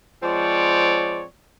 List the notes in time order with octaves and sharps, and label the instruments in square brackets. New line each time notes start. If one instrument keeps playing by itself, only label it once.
[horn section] F3 G#3 C4 C#5 D5